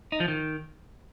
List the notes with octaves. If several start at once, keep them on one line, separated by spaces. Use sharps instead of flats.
D#4
F3
D#3